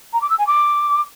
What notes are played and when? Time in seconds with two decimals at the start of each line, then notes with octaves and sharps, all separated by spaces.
0.13 A#5
0.21 D6
0.30 E6
0.38 G#5
0.46 D6